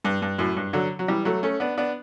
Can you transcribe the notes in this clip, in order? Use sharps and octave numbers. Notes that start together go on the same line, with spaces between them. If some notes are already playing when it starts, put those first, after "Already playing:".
G2
G2
F#2 A2
G2
D3 F#3
F#3
E3 G3
F#3 A3
A3 C#4
B3 D4
B3 D4